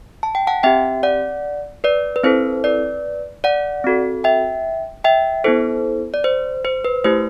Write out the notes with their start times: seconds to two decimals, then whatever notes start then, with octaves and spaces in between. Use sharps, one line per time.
0.23 A5
0.35 G5
0.47 F#5 A5
0.63 C4 G4 E5 G5
1.03 D5 F#5
1.84 B4 D5
2.16 B4
2.23 C4 E4 A4 C5
2.64 B4 D5
3.44 D5 F#5
3.84 C4 F#4 A4
4.24 E5 G5
5.04 E5 G5
5.44 B3 E4 A4 C5
6.14 D5
6.24 C5
6.65 C5
6.85 B4
7.04 A3 E4 G4 C5